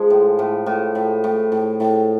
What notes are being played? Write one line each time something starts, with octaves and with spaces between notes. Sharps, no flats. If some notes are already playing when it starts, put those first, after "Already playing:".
Already playing: F3 G#3
A2
A2
A2
A2
A2
A2
A2